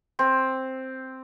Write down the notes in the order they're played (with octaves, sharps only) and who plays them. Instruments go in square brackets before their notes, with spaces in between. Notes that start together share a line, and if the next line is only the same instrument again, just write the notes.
[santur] C4